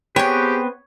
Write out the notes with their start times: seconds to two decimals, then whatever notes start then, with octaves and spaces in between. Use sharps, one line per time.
0.16 B3 C4 G4 G#4 B4 C#5 G5